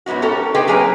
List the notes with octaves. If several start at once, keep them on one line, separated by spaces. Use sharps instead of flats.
G#2 F#3 B3 D#4 F#4
C#4 G4 A4 A#4
C4 G4 G#4 B4 D#5 G5
F#3 A#3 A#4 B4 G#5